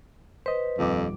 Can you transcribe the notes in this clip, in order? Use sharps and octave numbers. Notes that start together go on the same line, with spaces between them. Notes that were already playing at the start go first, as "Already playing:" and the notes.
B4 C5 D#5
D#1 F2 D6